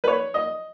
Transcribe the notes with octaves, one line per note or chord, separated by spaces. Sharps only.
B4
C#5
D#5